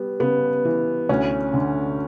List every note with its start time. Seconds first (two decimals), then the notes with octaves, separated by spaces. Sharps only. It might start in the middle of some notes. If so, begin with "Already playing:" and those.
Already playing: G3 B3
0.20 C#3 B3
0.65 E3
1.09 D2 C#4
1.54 D3